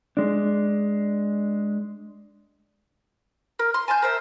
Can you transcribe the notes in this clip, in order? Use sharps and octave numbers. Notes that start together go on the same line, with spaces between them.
G#3 D4
A#4
C6
G#5 A5 C6 G6
A#4 C5 E5